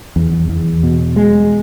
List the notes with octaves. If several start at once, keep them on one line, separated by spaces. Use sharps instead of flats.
E2
E2
B2
G#3